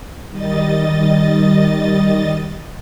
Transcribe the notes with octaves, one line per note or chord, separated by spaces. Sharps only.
D#3 G3 D#5 A6